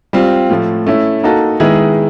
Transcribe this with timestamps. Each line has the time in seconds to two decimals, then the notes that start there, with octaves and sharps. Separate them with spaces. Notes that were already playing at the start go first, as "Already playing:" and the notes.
0.13 G3 C4 F4
0.50 A2 F3 A3
0.87 A3 C#4 E4
1.23 A#3 D#4 F#4 A4
1.60 D#3 G#3 B3 E4 G#4